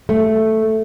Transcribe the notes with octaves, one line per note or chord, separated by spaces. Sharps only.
A3